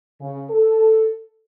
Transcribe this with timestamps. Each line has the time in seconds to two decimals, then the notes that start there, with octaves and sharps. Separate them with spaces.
0.21 C#3
0.50 A4